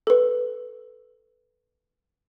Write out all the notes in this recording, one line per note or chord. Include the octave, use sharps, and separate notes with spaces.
A4 B4